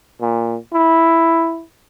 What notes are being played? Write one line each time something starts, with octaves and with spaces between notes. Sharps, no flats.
A#2
E4